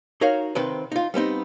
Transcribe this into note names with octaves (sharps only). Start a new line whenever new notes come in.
D#4 F#4 A#4 C#5 F5
C3 D#3 C4 B4
D#4 F4
G3 B3 C4 D#4